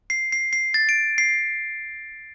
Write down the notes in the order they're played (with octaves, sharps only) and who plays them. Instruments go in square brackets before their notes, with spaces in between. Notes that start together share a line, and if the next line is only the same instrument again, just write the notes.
[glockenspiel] C7
C7
C7
A6
D7
C7